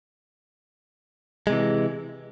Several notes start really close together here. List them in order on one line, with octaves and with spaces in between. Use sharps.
G#3 C3 E3